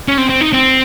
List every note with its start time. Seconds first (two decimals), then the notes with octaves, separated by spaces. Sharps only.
0.08 C#4
0.18 C4
0.29 C4
0.41 D#4
0.53 C4